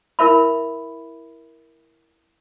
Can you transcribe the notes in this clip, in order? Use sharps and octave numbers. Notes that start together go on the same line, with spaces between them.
E4 A#4 E5 B5